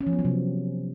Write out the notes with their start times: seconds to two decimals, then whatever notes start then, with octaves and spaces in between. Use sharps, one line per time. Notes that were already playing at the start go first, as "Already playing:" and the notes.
0.01 C#4
0.07 F3
0.13 B3
0.19 F#3
0.25 C3